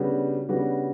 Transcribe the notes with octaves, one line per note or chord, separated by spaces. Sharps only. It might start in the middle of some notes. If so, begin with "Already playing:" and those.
Already playing: C#3 G3 B3 D4 F#4
C#3 G3 B3 D4 F#4